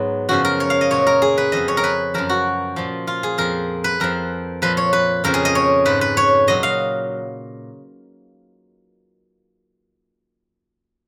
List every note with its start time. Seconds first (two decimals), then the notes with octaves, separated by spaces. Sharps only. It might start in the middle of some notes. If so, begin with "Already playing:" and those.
Already playing: G#2 F#3 B3
0.29 F#2 C#3 F3 F#4
0.45 A#4
0.60 C#5
0.70 F5
0.81 D#5
0.91 A#2 F#3 C#5
1.07 A#4
1.22 G#4
1.38 B4
1.52 F2 F3 D#5
1.68 C#5
1.77 A#4
1.84 B4
2.14 F#2 F3 A#4
2.29 F#4
2.76 A#2 F3
3.07 F4
3.23 G#4
3.38 F2 F3 A#4
3.84 B4
4.00 F2 F3 A#4
4.62 A#2 F3 B4
4.77 C#5
4.93 B4
5.24 F2 C#3 F3 A#4
5.34 G#4
5.45 D#5
5.55 C#5
5.85 G#2 F3 B4
6.01 B4
6.17 C#5
6.48 A#2 F#3 D#5
6.63 F5